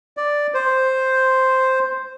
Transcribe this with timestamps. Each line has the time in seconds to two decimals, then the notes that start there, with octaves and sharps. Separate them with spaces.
0.17 D5
0.54 C5